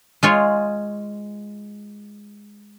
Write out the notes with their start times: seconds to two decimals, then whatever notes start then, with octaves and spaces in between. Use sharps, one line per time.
0.23 G#3 F4 C#5